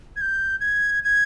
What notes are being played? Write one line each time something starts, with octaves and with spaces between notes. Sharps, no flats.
G#6
G6
G#6
G#6